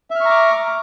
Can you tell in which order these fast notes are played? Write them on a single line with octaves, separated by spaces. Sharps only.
E5 F6 C#6 A#5 D6